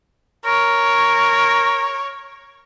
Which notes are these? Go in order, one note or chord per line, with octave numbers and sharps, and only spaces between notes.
A#4 C#5